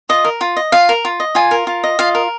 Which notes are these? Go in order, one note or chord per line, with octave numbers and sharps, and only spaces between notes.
F4 D#5
A#4
F4
D#5
F4 F5
A#4
F4
D#5
F4 G#5
A#4
F4
D#5
F4 F5
A#4